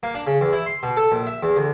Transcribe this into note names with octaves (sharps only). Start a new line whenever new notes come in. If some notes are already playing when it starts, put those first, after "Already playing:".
A#3
D4
C#3
E2
E4
C6
B2
A4
A#1
E5
E2
D2